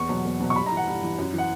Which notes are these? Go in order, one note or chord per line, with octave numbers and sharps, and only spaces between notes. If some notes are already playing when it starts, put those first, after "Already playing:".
Already playing: E2 C#6
B2 F#3
E2
B2 F#3
C#6
G2 B5
A#5
E3
F#5
G2
E3
F#2
E3
F#5